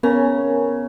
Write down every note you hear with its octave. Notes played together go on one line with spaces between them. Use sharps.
C#3 B3 A#4